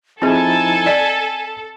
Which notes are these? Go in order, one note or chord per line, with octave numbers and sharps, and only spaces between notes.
F3 C4 D#4 E4 G#4 A4 G#5
D5 D#5 A6 B6